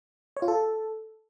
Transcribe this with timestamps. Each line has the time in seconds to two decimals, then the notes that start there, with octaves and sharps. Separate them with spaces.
0.37 C#5
0.42 F4
0.48 A4